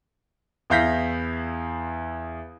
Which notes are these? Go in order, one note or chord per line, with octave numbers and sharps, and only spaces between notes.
E2 E4 F5 G6 A#6 B6